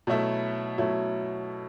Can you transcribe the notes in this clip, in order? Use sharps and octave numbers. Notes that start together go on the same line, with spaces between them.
B2 F#3 A3 E4
B2 F#3 A3 E4